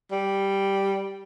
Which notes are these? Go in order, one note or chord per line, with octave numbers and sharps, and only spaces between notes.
G3